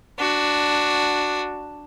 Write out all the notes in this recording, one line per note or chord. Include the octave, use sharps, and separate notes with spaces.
D4 F#4